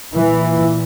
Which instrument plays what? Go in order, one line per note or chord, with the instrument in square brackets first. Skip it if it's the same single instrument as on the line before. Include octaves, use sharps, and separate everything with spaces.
[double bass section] A#2 E3